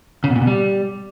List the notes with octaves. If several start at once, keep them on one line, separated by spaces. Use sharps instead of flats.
C#3
B2
A#2
B2
G3